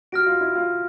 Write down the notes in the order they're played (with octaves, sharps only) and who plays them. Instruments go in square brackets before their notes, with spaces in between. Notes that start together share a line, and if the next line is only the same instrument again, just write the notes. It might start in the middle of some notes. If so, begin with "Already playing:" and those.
[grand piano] F#4 [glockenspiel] F6 A#6 D7
[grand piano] F4
E4
F4